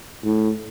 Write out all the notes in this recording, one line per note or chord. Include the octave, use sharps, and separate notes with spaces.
A2